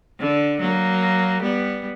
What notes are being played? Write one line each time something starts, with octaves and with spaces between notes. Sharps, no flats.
D3
F#3 A#3
G3 B3